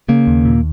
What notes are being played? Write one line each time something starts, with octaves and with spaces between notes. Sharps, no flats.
C#3 A#3
D#2
A#2